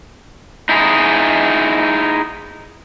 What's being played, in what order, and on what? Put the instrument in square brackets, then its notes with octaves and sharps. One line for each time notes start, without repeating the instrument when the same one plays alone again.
[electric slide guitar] D#4 E4 G#4